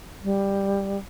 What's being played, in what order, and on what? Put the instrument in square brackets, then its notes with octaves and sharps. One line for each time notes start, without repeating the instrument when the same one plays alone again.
[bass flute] G3